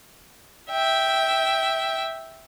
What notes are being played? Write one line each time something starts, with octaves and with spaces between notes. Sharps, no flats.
E5 G5